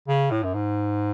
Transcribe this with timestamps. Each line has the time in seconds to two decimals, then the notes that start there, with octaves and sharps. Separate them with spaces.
0.08 C#3
0.31 A2
0.43 F#2
0.54 G#2